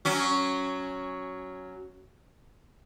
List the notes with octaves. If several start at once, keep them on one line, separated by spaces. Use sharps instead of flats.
F#3 C#4